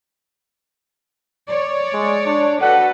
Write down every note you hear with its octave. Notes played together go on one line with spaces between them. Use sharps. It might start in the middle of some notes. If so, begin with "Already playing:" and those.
C#5 D5
G#3
D4
F#4 A4 B4 F#5